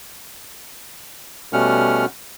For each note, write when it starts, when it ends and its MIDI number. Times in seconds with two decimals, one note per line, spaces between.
1.53 2.06 47
1.53 2.06 55
1.53 2.06 57
1.53 2.06 61
1.53 2.06 78
1.53 2.06 89